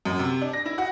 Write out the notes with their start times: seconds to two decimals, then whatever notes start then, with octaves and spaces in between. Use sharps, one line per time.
0.05 F#2
0.19 C3
0.42 D4
0.53 A#6
0.66 E4
0.78 F#4